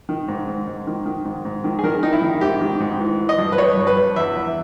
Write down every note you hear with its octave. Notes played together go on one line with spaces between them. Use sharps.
D#3
G#2
G#2
G#2
D#3
D#3
G#2
G#2
D#3
G#4
D#3 A#4
D#3 D#4
E4
D#3
G#2 G4
D#3
G#2
E3
E3
D#5
G2
B4
G2 C#5
G2
B4
G2
E2 E5
E2